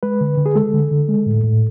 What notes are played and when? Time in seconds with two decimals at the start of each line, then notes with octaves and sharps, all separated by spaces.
0.03 G#3 B4
0.21 D3
0.38 D3
0.46 G#4
0.55 G#3 A4
0.73 D3
0.91 D3
1.08 G#3
1.26 A2
1.44 A2